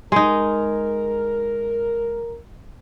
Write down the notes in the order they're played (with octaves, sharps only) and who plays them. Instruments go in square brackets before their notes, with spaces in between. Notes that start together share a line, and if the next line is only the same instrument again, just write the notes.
[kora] G#3 D#4 [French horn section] A#4